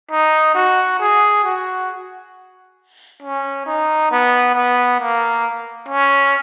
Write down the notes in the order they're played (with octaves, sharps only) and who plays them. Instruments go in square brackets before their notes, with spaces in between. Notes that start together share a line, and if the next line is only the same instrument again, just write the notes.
[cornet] D#4
F#4
G#4
F#4
C#4
D#4
B3
B3
A#3
C#4